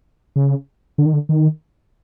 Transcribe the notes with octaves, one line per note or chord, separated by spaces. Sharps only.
C#3
D3
D#3
D3
D#3